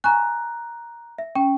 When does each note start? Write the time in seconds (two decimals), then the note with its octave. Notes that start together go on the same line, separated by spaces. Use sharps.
0.04 G#5 A#5 C#6 F#6
1.18 E5
1.35 C#4 G5